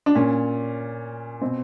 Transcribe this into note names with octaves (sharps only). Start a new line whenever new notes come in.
D4
A#2 C#4
B2 C4